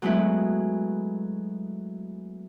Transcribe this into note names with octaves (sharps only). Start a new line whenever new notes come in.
F#3 G#3 A3 B3 E4